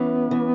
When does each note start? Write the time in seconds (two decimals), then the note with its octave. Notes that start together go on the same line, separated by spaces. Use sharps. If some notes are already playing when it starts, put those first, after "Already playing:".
Already playing: E3 B3 C#4
0.31 E3